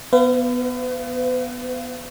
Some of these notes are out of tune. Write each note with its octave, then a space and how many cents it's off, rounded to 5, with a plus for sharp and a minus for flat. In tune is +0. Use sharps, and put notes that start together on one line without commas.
B3 +0 B4 +40 F5 -30